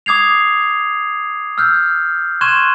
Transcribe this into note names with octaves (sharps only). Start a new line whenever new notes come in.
D6 D#6 G#6 C7 F7
E6 F6 G6
C6 C#6 F#6 G#6 D#7 E7